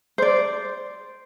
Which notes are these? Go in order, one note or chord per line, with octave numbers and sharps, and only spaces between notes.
C5 D5